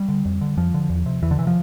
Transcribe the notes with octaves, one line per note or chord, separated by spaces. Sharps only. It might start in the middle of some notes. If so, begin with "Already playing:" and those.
Already playing: G3
D3
F2
D3
F2 F3
D3
E2
C3
E2 E3
D3
C3 E3
F3